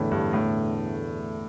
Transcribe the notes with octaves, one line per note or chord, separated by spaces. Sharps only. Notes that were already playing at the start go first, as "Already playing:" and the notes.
Already playing: E2 A2 D3 E3 A3
G2
A2